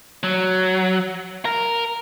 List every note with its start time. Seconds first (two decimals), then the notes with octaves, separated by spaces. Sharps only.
0.23 F#3
1.45 A#4